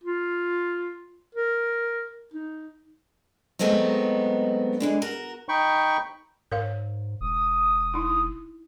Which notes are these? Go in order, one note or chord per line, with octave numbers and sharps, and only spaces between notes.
F4
A#4
D#4
F#3 G#3 A3 B3 C4 D#4
D3 E3 G#3
F#4 A#4
D#4 G5 B5 C#6
G#2 A#4 C#5 F5
E1 D#6
D#4 E4